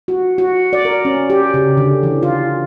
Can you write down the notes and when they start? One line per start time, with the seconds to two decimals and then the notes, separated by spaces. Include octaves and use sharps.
0.08 F#4
0.38 F#4
0.73 D5
0.85 A#4
1.05 C#4
1.30 G4
1.54 C#3
1.77 D3
2.03 E3
2.23 F4